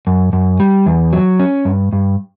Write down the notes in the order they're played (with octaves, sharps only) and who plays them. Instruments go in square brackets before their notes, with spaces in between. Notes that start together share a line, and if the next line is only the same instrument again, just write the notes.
[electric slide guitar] F#2
F#2
G3
E2
F#3
C#4
G2
G2